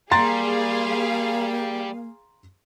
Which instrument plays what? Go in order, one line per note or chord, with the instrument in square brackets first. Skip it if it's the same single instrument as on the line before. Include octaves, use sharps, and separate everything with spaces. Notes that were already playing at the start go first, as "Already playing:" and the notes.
[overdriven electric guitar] G3 [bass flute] A#3 [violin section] G#4 F5 [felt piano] A#5 C6 A6